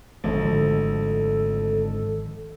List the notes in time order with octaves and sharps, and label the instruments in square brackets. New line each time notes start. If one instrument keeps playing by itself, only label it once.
[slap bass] G#1 F3 G#3 [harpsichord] D2 [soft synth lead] A4